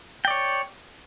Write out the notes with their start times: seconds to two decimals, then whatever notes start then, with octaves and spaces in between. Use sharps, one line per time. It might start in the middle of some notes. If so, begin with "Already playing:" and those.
0.25 G5
0.28 D5
0.31 C#5